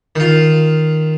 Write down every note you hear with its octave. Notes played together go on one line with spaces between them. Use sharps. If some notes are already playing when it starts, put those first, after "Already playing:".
D#3 F4